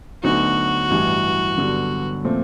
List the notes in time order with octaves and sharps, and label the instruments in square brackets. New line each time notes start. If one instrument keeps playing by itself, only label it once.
[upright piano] D2 D3 F#3 B3 D#4 [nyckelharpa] F#4
[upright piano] A1 G2 E3
G2 D3 F#3 B3
A#2 F3 A3 C4